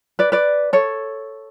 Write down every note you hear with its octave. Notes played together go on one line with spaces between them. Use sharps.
B4 D5
B4 D5
A4 C#5